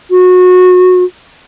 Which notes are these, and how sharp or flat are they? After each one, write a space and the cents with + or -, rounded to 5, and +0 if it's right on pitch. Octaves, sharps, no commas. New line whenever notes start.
F#4 -25